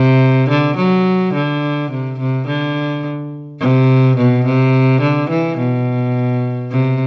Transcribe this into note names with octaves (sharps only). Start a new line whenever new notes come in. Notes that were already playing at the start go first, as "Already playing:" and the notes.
Already playing: C3
D3
F#3
D3
C3
C3
D3
C3
B2
C3
D3
E3
B2
C3